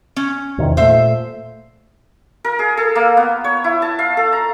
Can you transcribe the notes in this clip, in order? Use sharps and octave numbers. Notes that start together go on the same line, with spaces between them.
C#4
E2 C3 D#3
A#2 A3 C5 E5
A#4
G#4
A4
A#3
B3
C#5
E4
A5
F5
A4
A#5